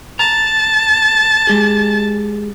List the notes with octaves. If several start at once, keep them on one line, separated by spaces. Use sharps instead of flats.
A5 A#5
G#3 G4 G#4